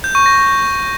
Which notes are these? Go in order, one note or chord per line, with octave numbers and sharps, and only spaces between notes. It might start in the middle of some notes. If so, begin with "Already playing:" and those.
G6
C#6
A#6